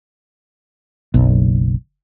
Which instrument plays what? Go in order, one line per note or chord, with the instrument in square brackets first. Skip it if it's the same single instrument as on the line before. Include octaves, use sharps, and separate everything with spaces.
[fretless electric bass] F#1 B1